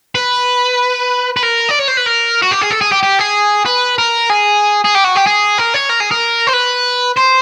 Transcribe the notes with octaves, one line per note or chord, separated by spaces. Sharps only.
B4
B4
A#4
D5
C#5
C5
B4
A#4
F#4
G4
G#4
A4
G#4
G4
G4
G#4
B4
A#4
G#4
G#4
G4
F#4
G4
G#4
A#4
C#5
A#4
G#4
A#4
C5
B4
C5